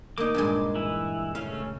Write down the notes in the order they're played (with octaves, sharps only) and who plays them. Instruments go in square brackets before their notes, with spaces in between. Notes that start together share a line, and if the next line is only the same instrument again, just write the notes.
[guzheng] A#3 D#4 [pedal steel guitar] D6
[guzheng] G2 A#2 G#3
[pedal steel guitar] E3 E4
[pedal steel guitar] C#3 A3 C#4 [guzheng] F5